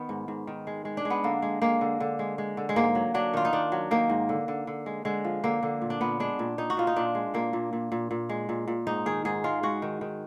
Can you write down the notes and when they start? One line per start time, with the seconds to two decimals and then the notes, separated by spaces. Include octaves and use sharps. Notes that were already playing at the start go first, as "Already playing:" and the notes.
Already playing: D#3 B3
0.09 G#2
0.28 G#2
0.47 D#3
0.67 G#3
0.85 G#3
0.97 D4
1.05 G#3
1.10 B3
1.24 D3 A#3
1.42 G#3
1.62 G#3 A#3
1.81 D3
2.00 D3
2.19 G#3
2.38 G#3
2.57 D3
2.69 G#3
2.76 G#2 A#3
2.95 F#3
3.14 F#3 D4
3.33 D#3 F4
3.45 D#4
3.53 D#3 D4
3.72 F#3
3.91 D#3 A#3
4.10 G#2
4.29 D3
4.48 D3
4.67 D3
4.86 G#3
5.05 D3 G#3
5.24 F3
5.43 D3 A#3
5.63 D3
5.81 A#2
5.90 D4
6.01 A#2 B3
6.20 G#3 D4
6.39 A#2
6.58 A#2 D#4
6.70 F#4
6.77 A#2 F4
6.87 D#4
6.96 A#2 D4
7.15 G#3
7.34 A#2 A#3
7.53 A#2
7.73 A#2
7.92 A#2
8.11 A#2
8.29 G#3
8.49 A#2
8.68 A#2
8.87 G#2 D#4
9.06 D#3 G#4
9.25 G#2 G#4
9.44 G#3 F4
9.63 G#3 F#4
9.82 D#3
10.01 D#3